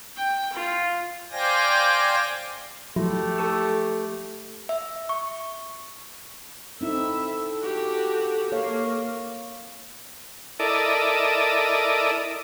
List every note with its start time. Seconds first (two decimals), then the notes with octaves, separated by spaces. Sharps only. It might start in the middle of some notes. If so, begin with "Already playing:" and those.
0.16 G5
0.54 F4
1.31 C5 D5 F5 G5 G#5 A#6
2.96 F3 F#3 A3 E4 G4
3.38 A4 C#6 E6
4.69 E5
5.09 C#6
6.81 C4 D#4 E4 A4 E5
7.62 F#4 G4
8.52 A#3 C#5 F5
10.59 E4 A4 A#4 D5 D#5